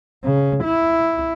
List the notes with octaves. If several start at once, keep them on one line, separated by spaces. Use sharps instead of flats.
C#3
E4